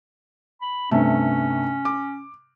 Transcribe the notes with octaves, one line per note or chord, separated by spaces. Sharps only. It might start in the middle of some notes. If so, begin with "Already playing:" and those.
B5
G2 C3 A3 C#4
D6